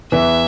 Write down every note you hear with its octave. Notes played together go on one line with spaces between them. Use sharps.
E2 E3 E5